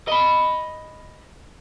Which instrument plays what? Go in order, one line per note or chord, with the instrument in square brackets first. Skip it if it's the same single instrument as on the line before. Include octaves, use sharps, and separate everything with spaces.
[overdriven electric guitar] D#5 B5